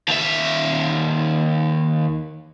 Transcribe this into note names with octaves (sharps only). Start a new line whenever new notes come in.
D#2 E5